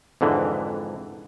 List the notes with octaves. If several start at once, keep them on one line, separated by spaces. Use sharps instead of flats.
F2 G#2 D3 E3